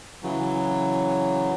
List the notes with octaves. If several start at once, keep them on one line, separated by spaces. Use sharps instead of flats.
C#3 E3 F#3